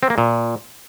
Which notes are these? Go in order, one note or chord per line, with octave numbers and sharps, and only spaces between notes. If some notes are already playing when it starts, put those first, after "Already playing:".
C4
A#3
A#2